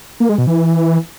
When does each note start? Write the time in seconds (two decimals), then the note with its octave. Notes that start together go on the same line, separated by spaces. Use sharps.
0.20 A#3
0.29 G#3
0.38 B2
0.47 E3